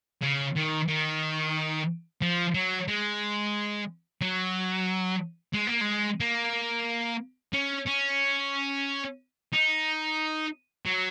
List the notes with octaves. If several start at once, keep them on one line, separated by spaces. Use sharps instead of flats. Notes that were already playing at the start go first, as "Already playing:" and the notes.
C#3
D#3
D#3
F3
F#3
G#3
F#3
G#3
A#3
G#3
A#3
C#4
C#4
D#4
F#3